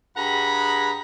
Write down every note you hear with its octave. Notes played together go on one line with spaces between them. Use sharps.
G2 G#4 F#5 A#5 B5